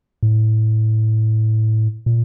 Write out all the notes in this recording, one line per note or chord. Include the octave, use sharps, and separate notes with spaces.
A2
A#2